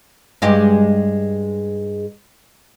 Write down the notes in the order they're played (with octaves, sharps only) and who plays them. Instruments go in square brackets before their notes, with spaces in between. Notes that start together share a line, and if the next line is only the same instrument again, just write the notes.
[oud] G2 G#3 G4